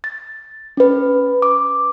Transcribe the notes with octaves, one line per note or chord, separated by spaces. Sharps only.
A6
C#4 B4
D6